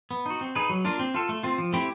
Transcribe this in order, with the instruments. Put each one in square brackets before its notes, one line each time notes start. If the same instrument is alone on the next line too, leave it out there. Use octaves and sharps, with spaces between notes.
[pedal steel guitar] B3
D#4 F#4
C4
D#4 G#4 B4
F#3
A#3 D4 F4
C4
F4 A4
A3
C4 F4
F3
A3 C4 E4 G4